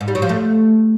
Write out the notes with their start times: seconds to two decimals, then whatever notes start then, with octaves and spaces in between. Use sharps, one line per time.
0.01 G#2
0.08 G3
0.15 F#3
0.22 F3
0.29 A3